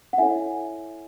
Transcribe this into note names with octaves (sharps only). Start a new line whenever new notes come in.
F#5
E4 A4 C#5 E5 G#5